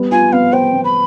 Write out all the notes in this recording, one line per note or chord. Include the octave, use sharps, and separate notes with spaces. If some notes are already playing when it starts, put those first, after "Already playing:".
Already playing: G3 B3
F4 G#5
B3 F5
C5 G5
B3
B5